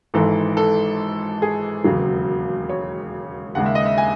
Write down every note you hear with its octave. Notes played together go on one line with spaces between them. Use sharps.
G#1 G#2 E3 A4
A4
G#4
E1 D#2 C#3 F#3
C#5
D#2 C#3 G#3 F#5
E5
D#5
E5
G#5